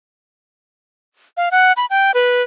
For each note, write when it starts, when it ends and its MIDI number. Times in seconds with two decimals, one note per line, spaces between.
1.37 1.49 77
1.51 1.72 78
1.77 1.86 83
1.90 2.11 79
2.14 2.42 71